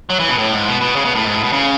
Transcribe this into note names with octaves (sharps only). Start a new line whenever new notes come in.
F#3
E3
B2
A2
G#2
B2
B2
C#3
B2
A2
G#2
A2
B2
C#3